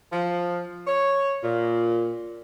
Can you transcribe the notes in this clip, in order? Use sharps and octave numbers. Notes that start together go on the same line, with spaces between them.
F3
C#5
A#2